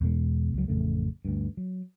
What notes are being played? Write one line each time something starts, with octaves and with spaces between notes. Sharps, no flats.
E2 B2 G#3
C#2 F#3
A1 F2 C#3 A3
D2 G2
F#3